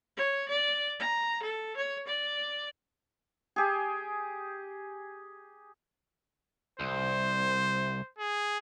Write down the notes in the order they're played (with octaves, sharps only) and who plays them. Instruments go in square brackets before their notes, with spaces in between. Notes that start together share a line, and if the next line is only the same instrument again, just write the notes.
[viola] C#5
D5
A#5
A4
C#5
D5
[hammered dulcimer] G4 G#4
[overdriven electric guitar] C2 [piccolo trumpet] C5
[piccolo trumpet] G#4